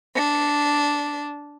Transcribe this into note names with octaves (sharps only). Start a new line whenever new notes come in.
D4